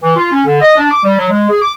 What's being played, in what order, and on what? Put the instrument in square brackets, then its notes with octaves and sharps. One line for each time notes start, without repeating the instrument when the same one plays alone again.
[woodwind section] E3
F4
C#4
D3
D#5
D4
D6
G3
F#3
G#3
G#4
D6